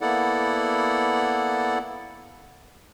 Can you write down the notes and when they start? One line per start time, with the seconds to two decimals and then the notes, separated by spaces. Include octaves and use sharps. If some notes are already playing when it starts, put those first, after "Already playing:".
0.01 A#3 B3 E4 A4 D5 F#5